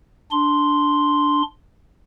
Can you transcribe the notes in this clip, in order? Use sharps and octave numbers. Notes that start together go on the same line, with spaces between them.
D4 C6